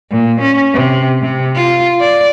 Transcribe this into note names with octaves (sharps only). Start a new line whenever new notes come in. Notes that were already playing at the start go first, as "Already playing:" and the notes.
A#2
C#4
C3
C3
F4
D5